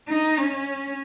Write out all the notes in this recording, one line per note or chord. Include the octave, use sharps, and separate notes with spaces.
D#4
C#4